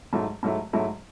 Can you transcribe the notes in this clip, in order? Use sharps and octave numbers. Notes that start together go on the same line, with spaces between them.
G#2 F#3 A3 E4
G#2 F#3 A3 E4
G#2 F#3 A3 E4